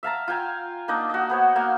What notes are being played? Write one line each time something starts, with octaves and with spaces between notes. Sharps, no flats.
E5 F5 A5 A#5
F4 G5 G#5 A#5
A#3 D4 D#4 D#5
F#4 D#5
B3 C5 C#5
A#3 F#4 F5